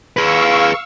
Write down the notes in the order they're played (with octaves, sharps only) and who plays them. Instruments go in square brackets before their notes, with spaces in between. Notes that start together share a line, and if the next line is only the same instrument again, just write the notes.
[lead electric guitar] G#4 B4 [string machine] F5 C#6 E6